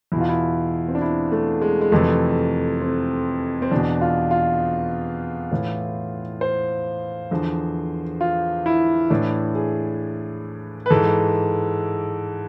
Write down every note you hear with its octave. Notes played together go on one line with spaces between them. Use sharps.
E2 B2 E4 F4
E4
C4
D4
E4
A3
G#3
G#3
F2 C3 E3 A3
C4
C4
E2 B2 D4
F4
F4
A2 E3
C5
E2 D3 F3
F4
E4
A2 E3 D4
G#4
B4
G#2 E3 A4